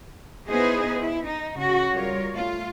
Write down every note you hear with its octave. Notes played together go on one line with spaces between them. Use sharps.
B3 D#4 E4 G#4 B4 C5
E4
D#4
C#3 F#4
G3 F4 A#4 C#5
A3 F4